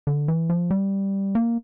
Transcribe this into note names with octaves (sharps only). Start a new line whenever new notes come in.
D3
E3
F3
G3
A#3